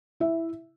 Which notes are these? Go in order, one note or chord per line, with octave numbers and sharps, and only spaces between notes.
E4 E5